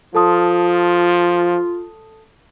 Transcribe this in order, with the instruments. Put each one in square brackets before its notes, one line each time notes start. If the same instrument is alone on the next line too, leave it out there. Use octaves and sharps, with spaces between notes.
[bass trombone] F3 [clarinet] F4 [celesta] A4 A5 D#6